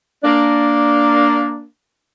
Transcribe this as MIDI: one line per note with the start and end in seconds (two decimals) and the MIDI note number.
0.24 1.63 58
0.24 1.63 62